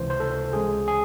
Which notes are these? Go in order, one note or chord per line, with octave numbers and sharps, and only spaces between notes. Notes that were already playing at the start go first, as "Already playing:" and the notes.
Already playing: C#2 C3 E3 C5
C5
A4
C#2 C#3 G#3 G#4
G#4